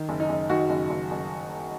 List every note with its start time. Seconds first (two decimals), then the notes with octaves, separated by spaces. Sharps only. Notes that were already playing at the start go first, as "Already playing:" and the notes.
Already playing: D#3
0.09 F#1
0.20 D#4
0.29 F#1
0.50 D#3 F#4
0.69 F#1
0.90 F#1
1.11 F#1